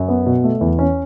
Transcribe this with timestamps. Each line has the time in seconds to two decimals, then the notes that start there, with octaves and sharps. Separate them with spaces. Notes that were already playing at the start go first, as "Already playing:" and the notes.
Already playing: F#2
0.09 B3
0.26 B2
0.44 A3
0.61 E2
0.79 C#4